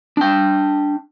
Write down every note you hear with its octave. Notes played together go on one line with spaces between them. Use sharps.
D4 G5